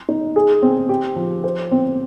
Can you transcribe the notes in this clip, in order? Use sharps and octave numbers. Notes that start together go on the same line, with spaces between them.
D#4
G#4
C4
G4
F3
C5
C4